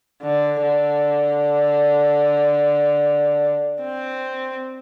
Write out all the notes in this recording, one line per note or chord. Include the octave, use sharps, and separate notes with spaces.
D3
D3
C4